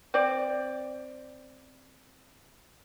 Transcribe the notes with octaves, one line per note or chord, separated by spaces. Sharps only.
C4 D5